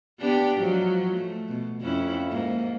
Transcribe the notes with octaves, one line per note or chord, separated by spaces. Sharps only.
B3 D4 G4
G#2 F3 F#3
A3
B2
F2 C#4 E4
G#2 A#3